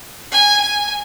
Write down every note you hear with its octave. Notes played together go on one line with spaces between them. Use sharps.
G#5
G#5